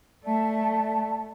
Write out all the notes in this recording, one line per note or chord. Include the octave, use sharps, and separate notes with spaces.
A3 D5 E5 A5